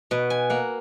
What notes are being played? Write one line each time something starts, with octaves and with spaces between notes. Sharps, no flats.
B2 B4
G#5
A#3 F#5